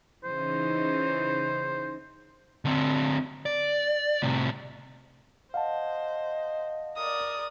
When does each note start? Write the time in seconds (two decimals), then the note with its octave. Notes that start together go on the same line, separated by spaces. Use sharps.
0.24 C#3 E3 D#4 C5
2.65 D3 C4
3.46 D5
4.23 A2 C3
5.54 C5 D#5 F5 F#5 A5
6.97 A#4 D5 D#6